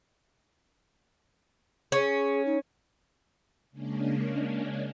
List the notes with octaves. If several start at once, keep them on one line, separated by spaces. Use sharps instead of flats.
C#4 G#4
D#4
C#3 G#3 A#3 C#4 D4